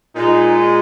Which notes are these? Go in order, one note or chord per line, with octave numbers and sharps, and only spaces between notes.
A#2 G#3 D#4